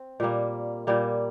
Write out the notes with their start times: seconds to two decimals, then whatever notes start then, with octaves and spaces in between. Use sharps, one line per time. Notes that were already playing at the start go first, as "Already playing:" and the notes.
Already playing: C4
0.20 A#2 G3 A#3
0.87 A#2 G3 A#3